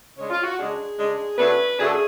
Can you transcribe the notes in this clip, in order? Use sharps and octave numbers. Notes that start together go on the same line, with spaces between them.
C#3 G#3 D4 C#5
F4
F#4
C#3 G#3 D4 G#4
C#3 G#3 D4
C#3 F#3 A3 D4 B4
C#3 F#3 A3 D4 G#4
A4
G#4